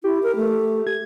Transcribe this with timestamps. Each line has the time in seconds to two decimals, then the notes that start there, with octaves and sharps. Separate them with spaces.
0.04 E4 G4
0.23 A#4
0.36 A3
0.87 G#6